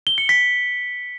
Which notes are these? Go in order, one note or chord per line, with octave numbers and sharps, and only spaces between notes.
G7
C#7
B6